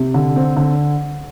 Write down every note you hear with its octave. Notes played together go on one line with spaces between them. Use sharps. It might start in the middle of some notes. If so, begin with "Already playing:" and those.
Already playing: C3
D3
C4
D3